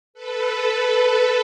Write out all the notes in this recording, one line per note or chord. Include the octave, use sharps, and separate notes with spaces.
A4 B4